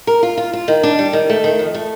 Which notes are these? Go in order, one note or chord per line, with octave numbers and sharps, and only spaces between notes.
A#4
F4
F4
F4
D#3
D4
G3
D#3
A3
D#3
F2
A3